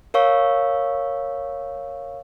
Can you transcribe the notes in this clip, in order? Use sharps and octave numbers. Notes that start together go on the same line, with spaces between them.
A#4 C#5 F5 C#6 E6